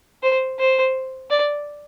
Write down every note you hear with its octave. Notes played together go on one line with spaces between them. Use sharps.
C5
C5
D5